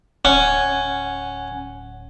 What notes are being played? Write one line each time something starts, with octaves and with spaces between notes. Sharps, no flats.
D1 C#4 F#5 G#5